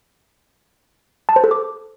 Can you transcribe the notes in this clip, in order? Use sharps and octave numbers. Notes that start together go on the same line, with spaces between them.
A5
C5
A4
D6